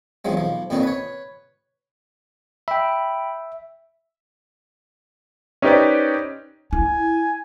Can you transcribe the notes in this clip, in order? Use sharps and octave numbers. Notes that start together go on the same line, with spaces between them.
E2 D#3 F3 F#3 G#3
B1 F3
F2 A#2 D#3 B3 C#4 D#4
B4 C#5
E5 G5 B5
C#4 D#4 G4 B4 C5 D5
E4 G#5